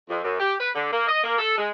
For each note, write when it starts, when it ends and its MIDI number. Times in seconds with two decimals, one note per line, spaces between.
0.10 0.22 41
0.24 0.39 42
0.39 0.55 67
0.59 0.70 71
0.75 0.91 50
0.92 1.07 58
1.07 1.21 75
1.24 1.39 58
1.39 1.56 69
1.58 1.71 56